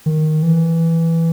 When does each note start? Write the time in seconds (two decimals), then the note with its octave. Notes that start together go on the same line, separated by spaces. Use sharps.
0.06 D#3
0.43 E3